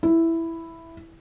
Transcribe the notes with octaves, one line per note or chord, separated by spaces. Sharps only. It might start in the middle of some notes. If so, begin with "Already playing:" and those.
E4